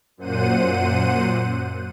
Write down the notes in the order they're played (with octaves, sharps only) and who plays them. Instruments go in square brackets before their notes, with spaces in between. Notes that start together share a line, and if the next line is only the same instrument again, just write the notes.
[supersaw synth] F#2 A#2 C5 F#5 D#7